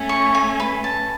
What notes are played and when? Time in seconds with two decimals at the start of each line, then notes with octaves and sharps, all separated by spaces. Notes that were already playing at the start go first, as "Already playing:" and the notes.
Already playing: A3 C#4
0.09 C#6
0.35 G#5
0.60 B4
0.84 A5